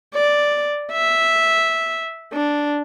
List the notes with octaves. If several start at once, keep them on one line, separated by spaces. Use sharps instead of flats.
D5
E5
D4